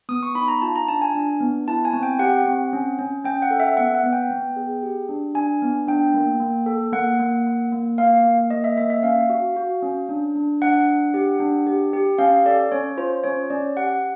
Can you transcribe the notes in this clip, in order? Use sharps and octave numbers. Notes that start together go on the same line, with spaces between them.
B3 D#6
C#6
D#4 B5
A#5
F4 A5
A#5
D4 A5
G#5
D4
B3
E4 A5
G#5
C4
G5
G4 F#5
C4
C#4
C#4
C#4 G5
F#5
A4
E5
B3 F#5
F#5
B3
G5
B3
G#4
G4
D4
D4 G#5
B3
D4 G5
A#3
A#3
A4
A#3 F#5
A#3
A#3
A#3
A#3 F5
A#3
A#3 D#5
E5
A#3 E5
E5
C#4 F5
F#4
F#4
C#4
D4
D4
D4 F#5
D4
G4
D4
G4
G4
C#4 F5
A4 D5
C#4 C#5
F4 C5
C#4 C#5
C#4 D5
G4 F#5